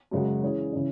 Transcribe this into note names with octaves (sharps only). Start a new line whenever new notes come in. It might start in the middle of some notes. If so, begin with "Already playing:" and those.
F#2 C#3 G#3 C#4 F#4
E3 C#4 G#4 C#5
C#3 E3 C#4